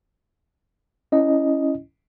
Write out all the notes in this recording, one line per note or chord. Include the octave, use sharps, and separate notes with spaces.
C#4 E4 D#5